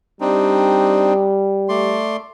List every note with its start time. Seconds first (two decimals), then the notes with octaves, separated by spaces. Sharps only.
0.21 G3 C4 D4 D#4
1.69 A3 D5 C6